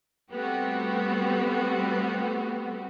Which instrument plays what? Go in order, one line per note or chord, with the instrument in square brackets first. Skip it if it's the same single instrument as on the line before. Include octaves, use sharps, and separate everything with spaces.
[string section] G3 A3 B3 C4 F#4 G4